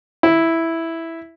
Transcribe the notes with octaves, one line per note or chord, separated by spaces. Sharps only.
E4